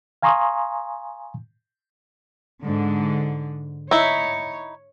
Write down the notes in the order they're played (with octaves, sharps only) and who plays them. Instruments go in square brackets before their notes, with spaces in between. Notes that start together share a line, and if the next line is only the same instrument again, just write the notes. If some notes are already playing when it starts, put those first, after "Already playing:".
[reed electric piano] F5 G#5 A#5 C6 C#6 D#6
[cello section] G#2 D3
[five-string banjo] D#4 E4 [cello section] C#5